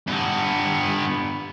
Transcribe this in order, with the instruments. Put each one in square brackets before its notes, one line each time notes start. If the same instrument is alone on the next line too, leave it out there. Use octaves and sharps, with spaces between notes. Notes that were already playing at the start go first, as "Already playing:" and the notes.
[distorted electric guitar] G2 B3